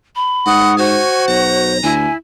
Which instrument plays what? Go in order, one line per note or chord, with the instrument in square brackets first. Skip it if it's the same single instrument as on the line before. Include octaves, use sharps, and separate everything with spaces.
[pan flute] B5
[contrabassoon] G#2 [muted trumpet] D#5 [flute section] F#5 C#6 D#6
[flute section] F#4 C#6 [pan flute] C5 [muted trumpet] G#5
[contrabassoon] B1 [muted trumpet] A#5
[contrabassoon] D2 [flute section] E4 [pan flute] G#5